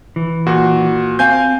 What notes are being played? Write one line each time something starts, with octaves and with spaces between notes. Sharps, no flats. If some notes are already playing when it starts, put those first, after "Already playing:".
E3
A#2 F#4
C4 F5 G#5 G6